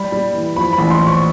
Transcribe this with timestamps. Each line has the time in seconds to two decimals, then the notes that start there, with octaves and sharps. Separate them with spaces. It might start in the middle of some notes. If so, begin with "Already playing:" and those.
Already playing: G3 B5
0.12 G3
0.34 E3
0.56 F3 B5
0.73 B5
0.78 A1
0.90 C6
1.01 F3
1.07 C#6